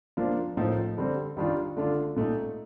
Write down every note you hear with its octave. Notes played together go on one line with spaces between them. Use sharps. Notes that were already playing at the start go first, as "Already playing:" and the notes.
F3 A#3 D4 F4
A2 F3 A#3 D#4
D3 G3 C4
D#3 G3 D4 F4
D3 A3 D4 F4
A#2 A3 D#4